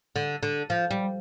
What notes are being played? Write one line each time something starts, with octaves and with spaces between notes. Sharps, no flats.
D3
D3
F3
G3